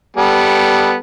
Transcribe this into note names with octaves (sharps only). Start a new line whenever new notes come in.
G3 B3 A4